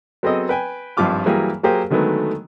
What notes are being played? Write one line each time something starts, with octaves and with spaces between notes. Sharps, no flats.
F#3 B3 C4 G#4 A4 D#5
B4 G5 G#5
G#1 G2 F3 F4 D6 F6
E3 F#3 G3 A#3 G#4
F#3 A#3 G4 G#4 A#4 C5
D3 D#3 F#3 G#3 A3 B3